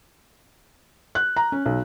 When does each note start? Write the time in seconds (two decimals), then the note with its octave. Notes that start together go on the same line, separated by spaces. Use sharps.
1.15 F#6
1.36 A#5
1.52 C#4
1.66 B1